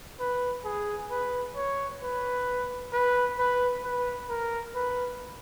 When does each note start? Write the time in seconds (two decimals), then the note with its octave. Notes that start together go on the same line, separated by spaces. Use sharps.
0.20 B4
0.65 G#4
1.10 B4
1.56 C#5
2.02 B4
2.93 B4
3.39 B4
3.84 B4
4.29 A#4
4.75 B4